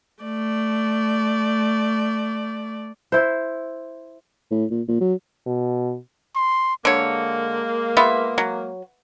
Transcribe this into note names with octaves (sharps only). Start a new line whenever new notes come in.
A3 D5
E4 C5
A2
A#2
A#2
F#3
B2
C6
D3 G#3 A#3 C#5
B3 F4 E5
F#3